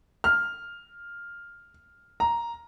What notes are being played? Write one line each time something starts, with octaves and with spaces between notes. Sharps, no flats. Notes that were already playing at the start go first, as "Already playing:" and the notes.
F6
A#5